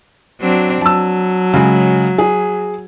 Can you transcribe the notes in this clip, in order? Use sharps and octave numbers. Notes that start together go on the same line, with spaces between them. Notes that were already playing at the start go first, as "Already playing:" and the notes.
F#3 C4 D4
F#3 A5 E6
C#3 G#3
G#4